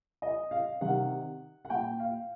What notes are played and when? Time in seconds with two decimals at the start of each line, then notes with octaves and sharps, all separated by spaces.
0.22 D#5
0.51 F5
0.81 C3 D#3 F#5
1.65 F#5
1.70 A#2 G5
2.00 F5